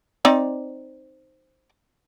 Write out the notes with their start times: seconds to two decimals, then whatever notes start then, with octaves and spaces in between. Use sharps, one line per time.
0.25 C4 D#4 D5